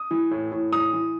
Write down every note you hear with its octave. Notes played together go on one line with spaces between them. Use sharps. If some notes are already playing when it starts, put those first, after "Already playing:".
Already playing: D#6
E3
A2
A2
E3 D#6
E3